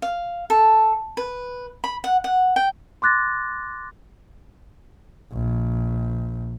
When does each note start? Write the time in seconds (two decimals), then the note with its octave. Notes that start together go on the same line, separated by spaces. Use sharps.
0.02 F5
0.50 A4
1.17 B4
1.84 B5
2.04 F#5
2.24 F#5
2.56 G5
3.02 C6 D6 F#6 A6 A#6
5.32 A#1